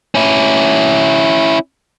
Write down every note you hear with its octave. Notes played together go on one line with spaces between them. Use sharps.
C#4 E4